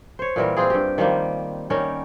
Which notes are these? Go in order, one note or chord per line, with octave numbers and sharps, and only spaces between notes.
C5 C#5
A#2 E3 G3 A#4
C4 F4 G#4
G2 G4
D#3 F3 G3 A#3
D#3 G3 C#4 A#4